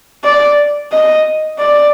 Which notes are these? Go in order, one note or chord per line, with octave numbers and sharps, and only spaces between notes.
D5
D#5
D5